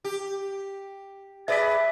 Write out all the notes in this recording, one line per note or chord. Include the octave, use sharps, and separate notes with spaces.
G4
G#4 B4 D5 E5 B6